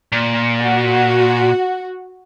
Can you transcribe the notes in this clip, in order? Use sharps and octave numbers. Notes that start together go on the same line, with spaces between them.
A#2
F#4